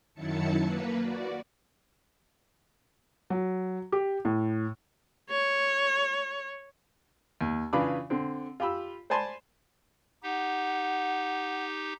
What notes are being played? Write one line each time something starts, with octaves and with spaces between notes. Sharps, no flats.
F#2 D#3 F#3 E4 A5 C#7
A#3 B4
F#4 D5
F#3
G4
A2
C#5
D#2
C#3 E3 D4 F4 B5 D6
D3 C4
F4 G4 B5 E6
C5 D5 G#5 A5 B5 C6
D#4 G4 F#5